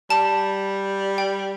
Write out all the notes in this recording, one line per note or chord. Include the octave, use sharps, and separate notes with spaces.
G3 A5
G5